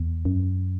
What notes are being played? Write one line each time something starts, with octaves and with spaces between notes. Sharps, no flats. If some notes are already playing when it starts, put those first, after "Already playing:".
Already playing: E2
F#2